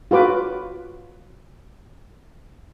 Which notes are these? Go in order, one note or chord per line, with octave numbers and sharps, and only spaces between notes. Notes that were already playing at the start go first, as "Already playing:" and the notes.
F4 F#4 B4 D6